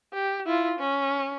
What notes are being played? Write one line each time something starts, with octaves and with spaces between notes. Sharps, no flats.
G4
E4 F4
C#4